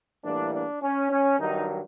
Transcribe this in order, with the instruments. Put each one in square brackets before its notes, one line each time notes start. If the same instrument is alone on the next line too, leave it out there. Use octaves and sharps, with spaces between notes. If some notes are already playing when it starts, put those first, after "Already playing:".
[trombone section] A2 E3 G3 A#3 D4
D4
C#4
C#4
G2 D#3 F#3 D#4